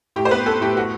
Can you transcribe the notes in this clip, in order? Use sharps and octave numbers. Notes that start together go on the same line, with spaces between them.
A2 G4
C5
B3 B4
B3 A4
A2 G4
F#4